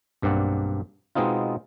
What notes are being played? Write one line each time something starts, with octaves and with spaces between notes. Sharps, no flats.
B1 G2 A#3 C4 D5 F#5
B2 G#3 B3 C4 D#4 F4